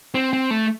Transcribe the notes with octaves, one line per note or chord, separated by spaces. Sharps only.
C4
C4
A3